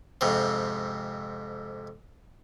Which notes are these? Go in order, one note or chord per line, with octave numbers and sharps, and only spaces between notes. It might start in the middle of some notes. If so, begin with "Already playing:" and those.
F2 G#2 C3